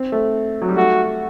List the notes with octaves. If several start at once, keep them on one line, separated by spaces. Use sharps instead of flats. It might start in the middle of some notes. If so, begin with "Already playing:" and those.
Already playing: C4
A3
F#3
G3
A3 F#4